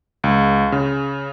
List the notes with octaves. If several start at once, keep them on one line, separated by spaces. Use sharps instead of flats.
C#2
C#3